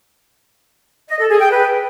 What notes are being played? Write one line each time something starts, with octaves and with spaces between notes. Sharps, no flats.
D#5
A4
G#4
G5
B4